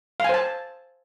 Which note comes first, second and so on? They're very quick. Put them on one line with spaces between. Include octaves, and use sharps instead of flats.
F5 G#5 C5 A5